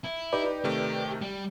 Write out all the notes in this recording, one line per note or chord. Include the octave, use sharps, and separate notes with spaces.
E4
D#4 G4 B4 D5
C3 D#3 A3 G4
G3